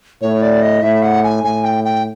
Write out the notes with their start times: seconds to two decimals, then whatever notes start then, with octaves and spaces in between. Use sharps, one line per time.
0.21 A2 C#5
0.42 D5
0.62 D#5
0.83 A2 E5
1.03 F#5
1.24 G#5
1.44 A2 G#5
1.64 G5
1.84 G5